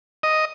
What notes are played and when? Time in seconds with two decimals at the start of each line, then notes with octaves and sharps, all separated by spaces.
0.23 D#5